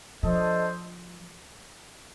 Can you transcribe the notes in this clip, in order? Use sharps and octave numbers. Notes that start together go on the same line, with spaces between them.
F3 D4 A4 C5 D#5